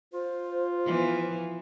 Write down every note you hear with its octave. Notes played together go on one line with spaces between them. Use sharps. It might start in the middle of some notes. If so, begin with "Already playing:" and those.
F4 C5
E3 F3 B3